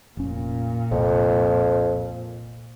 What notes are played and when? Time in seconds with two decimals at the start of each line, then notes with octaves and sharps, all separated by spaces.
0.17 F1 A#2 C#4
0.91 F1 C2 F2